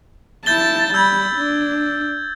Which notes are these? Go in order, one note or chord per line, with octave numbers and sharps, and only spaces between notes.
E4 A5 G6 A6 G7
G3 B5 E6 G6 G#6
D4